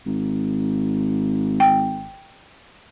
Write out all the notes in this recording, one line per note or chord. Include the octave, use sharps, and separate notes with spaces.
G#1
G5